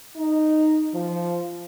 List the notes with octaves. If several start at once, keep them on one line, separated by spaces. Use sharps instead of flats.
D#4
F3